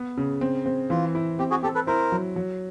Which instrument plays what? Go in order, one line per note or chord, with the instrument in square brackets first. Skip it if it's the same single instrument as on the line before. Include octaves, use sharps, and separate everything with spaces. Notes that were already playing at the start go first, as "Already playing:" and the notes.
Already playing: [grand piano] B3
C#3
C4
C4
[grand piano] E3 [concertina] F4
[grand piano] E4
[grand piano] C4 [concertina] G4
[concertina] F#4 G#4
[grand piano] C4 [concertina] G4 A4
[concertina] A4 B4
[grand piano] E4 [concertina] A#4 C5
[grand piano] F#3
F#3